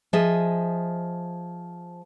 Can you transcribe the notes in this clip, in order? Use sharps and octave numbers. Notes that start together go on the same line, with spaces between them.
F3 G#4 D#5 E5